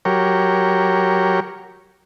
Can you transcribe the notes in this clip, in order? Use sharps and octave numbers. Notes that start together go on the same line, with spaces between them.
F#3 G4 A#4 C#5